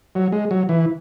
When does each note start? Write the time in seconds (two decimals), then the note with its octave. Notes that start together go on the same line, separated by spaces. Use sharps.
0.15 F#3
0.32 G#3
0.51 F#3
0.69 E3